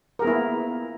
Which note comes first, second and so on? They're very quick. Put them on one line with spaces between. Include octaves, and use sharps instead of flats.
A#4 G#4 B3 E4 A#3